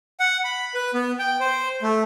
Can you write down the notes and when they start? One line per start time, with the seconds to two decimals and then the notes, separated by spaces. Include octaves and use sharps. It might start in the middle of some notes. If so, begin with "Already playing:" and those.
0.20 F#5
0.44 B5
0.74 B4
0.94 B3
1.19 G5
1.40 C5
1.82 A3